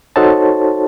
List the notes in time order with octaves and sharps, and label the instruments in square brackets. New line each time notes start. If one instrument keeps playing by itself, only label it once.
[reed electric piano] D#4 F#4 A4 C5 C#5 A5